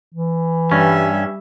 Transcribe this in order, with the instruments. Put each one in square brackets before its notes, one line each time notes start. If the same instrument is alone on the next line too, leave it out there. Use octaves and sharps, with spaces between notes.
[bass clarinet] E3
[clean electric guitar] G2 C#4 [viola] G3 E5